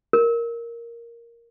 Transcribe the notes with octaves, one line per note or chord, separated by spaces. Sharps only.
A#4